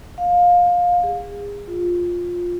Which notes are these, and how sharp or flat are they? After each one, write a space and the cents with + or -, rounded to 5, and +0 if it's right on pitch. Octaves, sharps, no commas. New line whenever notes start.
F5 +20
G#4 -35
F4 +10